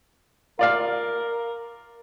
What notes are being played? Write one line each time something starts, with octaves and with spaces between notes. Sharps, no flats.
F4 A#4 D5 F5